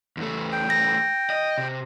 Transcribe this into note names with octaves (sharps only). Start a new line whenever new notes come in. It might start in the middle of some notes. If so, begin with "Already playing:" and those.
E2 A3
G5
A#6
D#5
C3